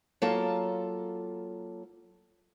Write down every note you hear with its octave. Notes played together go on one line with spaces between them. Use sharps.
F#3 A#3 F4 A4 A5